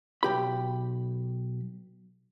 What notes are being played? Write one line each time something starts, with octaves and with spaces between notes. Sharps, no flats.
B1 G2 G4 B5